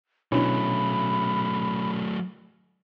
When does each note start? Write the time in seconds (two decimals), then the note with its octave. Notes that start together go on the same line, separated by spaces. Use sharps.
0.32 B2 F#3 A3 C#4 D4 E4 B5